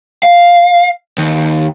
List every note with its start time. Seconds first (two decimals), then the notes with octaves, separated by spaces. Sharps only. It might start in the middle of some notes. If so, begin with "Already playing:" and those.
0.23 F5
1.18 D#2